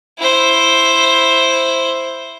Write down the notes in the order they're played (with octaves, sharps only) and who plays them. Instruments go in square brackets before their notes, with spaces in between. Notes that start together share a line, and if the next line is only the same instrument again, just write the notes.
[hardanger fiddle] E4 C5